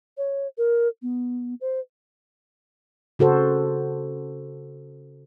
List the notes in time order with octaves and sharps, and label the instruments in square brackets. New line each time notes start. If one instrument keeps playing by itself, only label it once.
[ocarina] C#5
A#4
B3
C5
[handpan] C#3 F#4 A4 C5